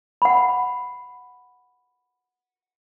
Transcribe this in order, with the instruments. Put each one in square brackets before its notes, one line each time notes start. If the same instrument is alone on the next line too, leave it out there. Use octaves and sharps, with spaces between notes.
[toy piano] F#5 B5